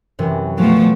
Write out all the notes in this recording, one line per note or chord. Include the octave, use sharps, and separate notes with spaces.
F#2 C3 E3
B2 F3 F#3 A3 F4